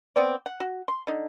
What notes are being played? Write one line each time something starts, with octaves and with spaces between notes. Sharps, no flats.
B3 C4 D5
F#5
F#4
C6
D3 D#4